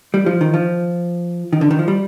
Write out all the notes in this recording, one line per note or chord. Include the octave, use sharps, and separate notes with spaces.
G3
F3
D#3
F3
D#3
D3
D#3
F3
G3